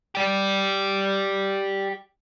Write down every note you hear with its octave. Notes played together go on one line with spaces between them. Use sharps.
G4 D5